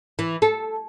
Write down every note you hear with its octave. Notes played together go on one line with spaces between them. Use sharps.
E3
A4